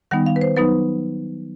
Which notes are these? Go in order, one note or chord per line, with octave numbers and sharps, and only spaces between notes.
D#3 G3 B3 D#4 F#5
F5
B4
C5
F#3 B3 D#4 B4